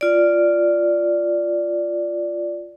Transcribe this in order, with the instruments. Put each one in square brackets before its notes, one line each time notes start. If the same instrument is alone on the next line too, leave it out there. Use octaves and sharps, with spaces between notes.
[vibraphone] F4 D5